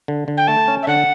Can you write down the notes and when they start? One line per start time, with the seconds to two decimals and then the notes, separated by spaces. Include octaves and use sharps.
0.08 D3
0.28 D3
0.37 G5
0.48 A3 A5
0.68 C#4
0.83 E5
0.87 D3 F#5